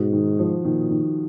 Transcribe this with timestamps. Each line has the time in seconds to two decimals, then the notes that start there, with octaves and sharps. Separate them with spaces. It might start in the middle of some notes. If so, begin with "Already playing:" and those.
Already playing: G#2 B2
0.13 D#3
0.39 F3
0.65 A#2 D#3
0.90 D#3